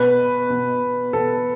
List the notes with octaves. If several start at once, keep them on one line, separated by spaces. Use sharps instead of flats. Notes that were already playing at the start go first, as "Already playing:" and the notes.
Already playing: B2 B4
B2
B2 A4